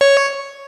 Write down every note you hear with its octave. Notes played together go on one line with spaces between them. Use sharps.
C#5